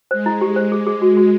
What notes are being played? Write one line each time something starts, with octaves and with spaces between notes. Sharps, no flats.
G#3 C5
E4
G4
C5
G#4
G#4
F#4
F#4